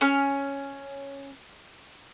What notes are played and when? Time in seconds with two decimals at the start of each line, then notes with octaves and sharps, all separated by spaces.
0.01 C#4 F6